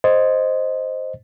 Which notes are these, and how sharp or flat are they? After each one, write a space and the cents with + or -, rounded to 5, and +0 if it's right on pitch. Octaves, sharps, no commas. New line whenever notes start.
C5 +0 D#5 +0